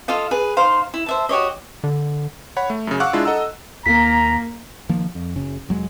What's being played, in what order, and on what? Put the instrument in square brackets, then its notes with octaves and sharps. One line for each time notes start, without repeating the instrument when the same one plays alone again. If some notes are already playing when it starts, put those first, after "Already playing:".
[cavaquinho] F4 A4 D#5 F5
G#4 B4
D#4 C5 F5
E4
C5 E5 A5
F#4 G4 C#5 D#5
[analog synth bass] D3
[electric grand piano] C#5 F#5 B5
A3
F#2 C#3
F5 F#5 C#6 D6 E6 F#6
G#3 D4 E4 F4
A4 D#5 F#5 A#5 E6
[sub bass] D#2 [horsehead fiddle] A#3 [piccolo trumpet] A#5 [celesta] B6
[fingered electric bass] D#3 F3 A#3
F2
F#1 C#3
F1 F#3 G#3